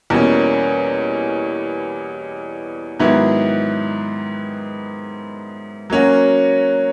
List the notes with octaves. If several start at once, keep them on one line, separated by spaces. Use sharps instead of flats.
E2 B2 G3 A#3 C#4
G#2 D#3 F#3 B3 E4
F#3 A#3 C#4 F#4